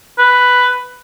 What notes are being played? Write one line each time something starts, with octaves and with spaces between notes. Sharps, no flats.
B4